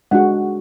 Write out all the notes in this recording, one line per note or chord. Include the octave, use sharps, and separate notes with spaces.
G#3 D4 F#4 F#5